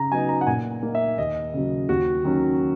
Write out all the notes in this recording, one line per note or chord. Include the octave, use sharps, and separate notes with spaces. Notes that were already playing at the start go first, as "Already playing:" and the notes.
Already playing: C#3 A#5
F#3 B3 D#4 G#5
A#5
F#5
A#2 G#5
A#3 D#4
E5
D#2 D#5
C#3 F#3
D#2 F#4
D#3 F#3 C#4